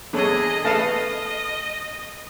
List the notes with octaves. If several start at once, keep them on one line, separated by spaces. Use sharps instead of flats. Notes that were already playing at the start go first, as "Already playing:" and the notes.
E2 D4 G#4 A4 C#5 D#5
A3 A4 B4 D#5 F5 A5